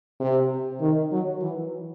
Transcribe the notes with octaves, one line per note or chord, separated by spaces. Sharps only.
C3
D#3
F#3
E3